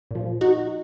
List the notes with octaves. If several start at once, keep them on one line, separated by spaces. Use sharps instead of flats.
A#2 F3
D#4 F#4